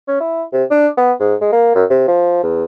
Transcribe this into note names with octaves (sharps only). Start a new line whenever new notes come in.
C#4
E4
C3
D4
B3
G#2
G#3
A#3
F#2
C3
F3
E2